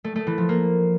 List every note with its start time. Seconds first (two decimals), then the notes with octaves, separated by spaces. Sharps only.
0.04 A3
0.16 A3
0.27 E3
0.38 F3
0.49 A#3